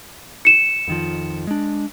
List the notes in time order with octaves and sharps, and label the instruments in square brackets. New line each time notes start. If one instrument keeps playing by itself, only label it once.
[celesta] C#7 E7
[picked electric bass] F2 D#3 F3
G#3 D4